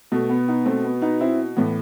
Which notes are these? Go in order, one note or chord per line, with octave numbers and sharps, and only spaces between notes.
B2 A3
B3
B3 D#4
A3 C4
B3
B3 D#4
C4 E4
A2 E3 B3